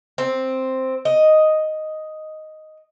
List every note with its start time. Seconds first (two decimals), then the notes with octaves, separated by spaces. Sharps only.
0.18 C4
1.05 D#5